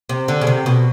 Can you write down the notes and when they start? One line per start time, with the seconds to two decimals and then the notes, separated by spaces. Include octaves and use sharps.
0.09 C3
0.28 D3
0.41 C#3
0.47 C3
0.66 B2